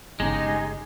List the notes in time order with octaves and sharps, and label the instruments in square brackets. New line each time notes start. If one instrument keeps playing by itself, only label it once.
[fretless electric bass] G1 C#3 C#4 [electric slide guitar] G#3 [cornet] D#4 [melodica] G4 G#5